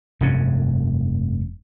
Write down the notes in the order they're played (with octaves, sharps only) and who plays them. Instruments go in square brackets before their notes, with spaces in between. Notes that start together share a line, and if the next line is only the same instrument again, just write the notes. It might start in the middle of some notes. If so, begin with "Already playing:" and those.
[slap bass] F1 G2 C#4